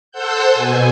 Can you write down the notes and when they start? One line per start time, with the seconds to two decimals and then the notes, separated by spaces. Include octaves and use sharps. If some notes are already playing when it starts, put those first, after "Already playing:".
0.12 A4 C5 F#5 E6 F#6 G6
0.51 B2 G#5